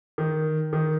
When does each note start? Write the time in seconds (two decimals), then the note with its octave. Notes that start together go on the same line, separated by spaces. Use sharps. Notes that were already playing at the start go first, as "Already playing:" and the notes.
0.18 D#3
0.73 D#3